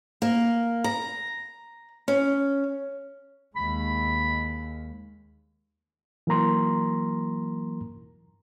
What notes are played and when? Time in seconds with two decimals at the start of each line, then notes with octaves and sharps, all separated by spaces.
0.22 A#3
0.84 A#5
2.08 C#4
3.56 D#2 G#3 B5
6.27 E3 F#3 A#3 A#4 A#5 C6